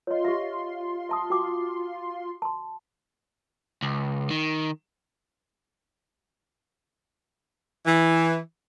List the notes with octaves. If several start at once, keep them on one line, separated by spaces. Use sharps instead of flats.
F4 C#5 D#5 C6
G4 E5
E5 A5 D#6
F#4 G5 D6
A5 C6
C#2
D#3
E3